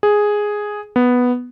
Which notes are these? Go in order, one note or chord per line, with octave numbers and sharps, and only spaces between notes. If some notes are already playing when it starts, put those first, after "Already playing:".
G#4
B3